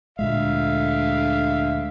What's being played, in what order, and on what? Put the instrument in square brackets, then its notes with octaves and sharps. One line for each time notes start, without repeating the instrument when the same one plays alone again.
[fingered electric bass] D2 A#2 G#3 [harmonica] D3 E5 F5